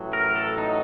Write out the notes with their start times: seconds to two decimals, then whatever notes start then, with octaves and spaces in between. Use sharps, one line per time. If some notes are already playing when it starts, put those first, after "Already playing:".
Already playing: A1 A2 F#3
0.13 A#4
0.35 A4
0.58 D#4